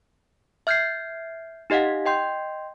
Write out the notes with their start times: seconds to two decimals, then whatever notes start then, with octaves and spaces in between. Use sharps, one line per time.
0.67 E5 F6 G6 G#6 C7
1.70 D#4 G4 D#5 F5 F#5
2.06 D#5 G5 C6 G6